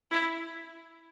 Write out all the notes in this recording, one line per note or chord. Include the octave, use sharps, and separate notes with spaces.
E4